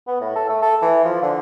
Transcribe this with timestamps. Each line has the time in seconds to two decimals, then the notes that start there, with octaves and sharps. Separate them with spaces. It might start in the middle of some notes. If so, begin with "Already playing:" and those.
0.07 B3
0.20 A2
0.36 A4
0.49 A3
0.62 A4
0.82 E3
1.05 F3
1.22 D3